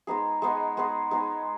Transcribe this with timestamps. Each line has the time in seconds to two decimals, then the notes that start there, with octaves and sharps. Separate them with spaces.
0.07 G#3 B3 D#4 G#4
0.42 G#3 B3 D#4 G#4
0.77 G#3 B3 D#4 G#4
1.11 G#3 B3 D#4 G#4